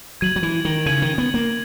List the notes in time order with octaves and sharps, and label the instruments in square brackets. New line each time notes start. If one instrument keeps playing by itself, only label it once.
[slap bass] F#3 [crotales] G#6 D#7 F#7
[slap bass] F#3
E3
D#3
[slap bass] C#3 [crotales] G#6 D#7 F#7
[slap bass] D#3
B3
A#3